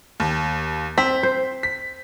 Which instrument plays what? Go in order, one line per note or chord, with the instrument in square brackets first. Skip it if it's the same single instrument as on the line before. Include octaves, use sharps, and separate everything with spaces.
[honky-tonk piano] D#2
[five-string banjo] C4 [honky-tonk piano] B6
[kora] C5
[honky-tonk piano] B6